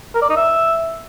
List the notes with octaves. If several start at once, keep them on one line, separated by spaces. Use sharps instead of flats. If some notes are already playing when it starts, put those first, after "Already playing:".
A#4
D5
D#4
E5